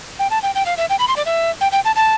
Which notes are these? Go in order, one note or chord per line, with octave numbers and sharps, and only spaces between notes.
G5
A5
G5
G5
F5
E5
G5
B5
C6
D5
E5
G5
G5
A5
A5